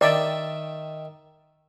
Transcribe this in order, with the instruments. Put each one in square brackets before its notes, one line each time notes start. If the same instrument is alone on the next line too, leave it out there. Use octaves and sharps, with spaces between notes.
[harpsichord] D#3 E5 G5 [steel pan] D5